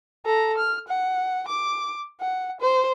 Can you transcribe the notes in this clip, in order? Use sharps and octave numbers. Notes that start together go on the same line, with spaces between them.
A4 A#5
F6
F#5
D6
F#5
C5